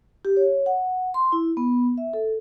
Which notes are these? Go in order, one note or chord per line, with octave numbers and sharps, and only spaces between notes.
G4
C#5
F#5
C6
E4
B3
E5
A4